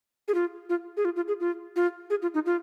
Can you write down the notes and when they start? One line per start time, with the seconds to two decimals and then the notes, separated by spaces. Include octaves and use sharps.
0.28 G#4
0.34 F4
0.69 F4
0.97 G#4
1.05 F4
1.16 F4
1.28 G#4
1.40 F4
1.76 F4
2.10 G#4
2.22 F4
2.34 D#4
2.46 F4